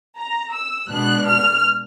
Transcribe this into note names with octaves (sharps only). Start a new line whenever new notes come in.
A#5
E6
B2 G#3 B3 D4 F#6
F6